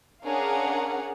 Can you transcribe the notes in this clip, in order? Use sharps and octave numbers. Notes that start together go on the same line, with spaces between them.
C#4 D4 G#4 A#4 F5 F#5